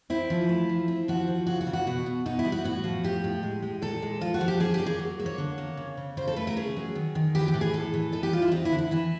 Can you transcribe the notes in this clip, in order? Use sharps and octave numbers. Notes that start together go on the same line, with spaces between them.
C4 E4
F3
A3
F3
C4
F3 F#4
F3
C#3 F#4
F#4
C#3
F#4
B2
B2
B2 D#4
E4
G3
F#4
A2 F#4
F3
A2 G4
A2
G#3
G#3
A#2 A4
G#3
F3 F4
F#4
F3
G4
C#4 G#4
G4
A#3
G#4
F#3
A#3
C#5
D3
A#3
C#3
C#3
C#3 C5
A4
A3 B4
A#4
C#4 G#4
F#3
D#3
D#3
E3 G4
G4
A2
G#4
A2 A4
E3
D#4 A4
G4
G3 F4
E4
C4 D#4
E4
D3
E4
E3 E4